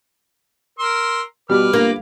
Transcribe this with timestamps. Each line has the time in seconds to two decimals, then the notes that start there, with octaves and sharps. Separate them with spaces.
0.79 A#4 C6 E6
1.49 B2 G3 B4 D6 F6
1.73 G1 A#3